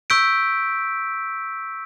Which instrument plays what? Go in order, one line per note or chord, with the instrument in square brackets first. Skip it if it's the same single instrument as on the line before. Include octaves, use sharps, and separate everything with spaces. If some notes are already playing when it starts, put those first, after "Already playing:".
[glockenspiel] C#6 E6 G6 B6 D7